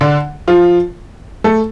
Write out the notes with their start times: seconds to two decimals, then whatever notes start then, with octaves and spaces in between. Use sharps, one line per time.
0.01 D3 D4
0.48 F3 F4
1.44 A3 A4